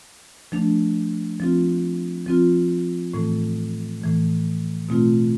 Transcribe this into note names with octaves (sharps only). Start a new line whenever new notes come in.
F3 A3 D4
F3 C4 F4
F3 C4 F4
A2 E3 A3
A2 E3 A3
B2 A3 C4 F4